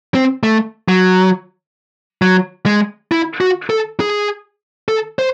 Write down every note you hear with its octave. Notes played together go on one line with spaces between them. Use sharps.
C4
A3
F#3
F#3
G#3
E4
F#4
A4
G#4
A4
C5